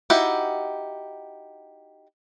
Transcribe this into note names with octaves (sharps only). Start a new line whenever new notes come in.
D#4 E4 F#4 G4